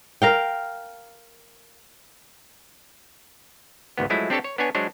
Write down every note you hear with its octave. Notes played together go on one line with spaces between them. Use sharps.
A#4 F5 G5
G#1 D2 B3
F3 F#3 G#3 A3 E4
C4 D4 G4 A4 C#5 A5
C#5
B3 D4 C#5 G#5
F#3 G#3 D4 C5 C#5